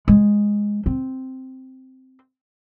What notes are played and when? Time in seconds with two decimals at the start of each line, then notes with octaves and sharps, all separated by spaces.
0.08 G#3
0.86 C4